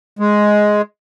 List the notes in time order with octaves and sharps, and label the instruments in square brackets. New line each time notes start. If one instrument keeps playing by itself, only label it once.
[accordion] G#3